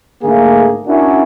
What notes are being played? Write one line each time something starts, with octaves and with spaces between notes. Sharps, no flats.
G#2 D3 A3 A#3 G#4
C#4 D4 E4 F#4 A#4